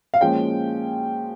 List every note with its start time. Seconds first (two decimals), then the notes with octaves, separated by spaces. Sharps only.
0.14 F5
0.21 A#2 F3 G#3 C#4 G5